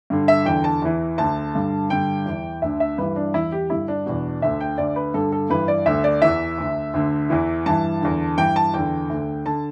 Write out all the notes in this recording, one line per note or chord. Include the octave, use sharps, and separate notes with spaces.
G2 D3
E5
E2 D3 G5
A5
E2 E3
D2 D3 A5
G2 D3
G2 D3 G5
E2 E3
D2 D3 E5
E5
G2 E3 B4
D4
E2 E3 E4
G4
G2 D3 E4
D4
E2 B2
D2 D3 E5
G5
D2 D3 D5
B4
G2 D3 A4
A4
G2 E3 B4
D5
D2 D3 E5
D5
E2 E3 E5
D2 D3
D2 D3
E2 E3
G2 E3 A5
E2 D3
G2 E3 G5
A5
E2 D3 G5
D2 D3
D3 A5